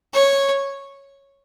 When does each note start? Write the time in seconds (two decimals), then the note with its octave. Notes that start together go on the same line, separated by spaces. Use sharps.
0.14 C#5